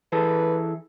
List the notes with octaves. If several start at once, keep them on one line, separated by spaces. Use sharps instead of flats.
E3 G#4 A4 B4